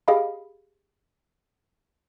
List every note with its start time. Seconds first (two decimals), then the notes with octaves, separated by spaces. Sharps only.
0.08 G4 G#4 D#5 F5 B5